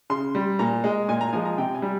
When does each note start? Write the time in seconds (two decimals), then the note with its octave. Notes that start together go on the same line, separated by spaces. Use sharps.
0.10 C#3 C6
0.35 G3
0.59 A#2 A#5
0.84 G#3
1.09 A#2 G#5
1.21 A#5
1.33 F3 G#3 G#5
1.46 A#5
1.58 C3 G5
1.74 G#5
1.82 G3